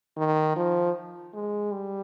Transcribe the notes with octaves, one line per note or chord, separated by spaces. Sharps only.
D#3
F3
G#3
G3